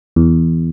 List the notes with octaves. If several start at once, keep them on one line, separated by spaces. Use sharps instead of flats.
E2